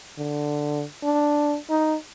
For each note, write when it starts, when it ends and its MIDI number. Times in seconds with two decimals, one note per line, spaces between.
0.18 0.85 50
1.03 1.57 62
1.70 1.96 63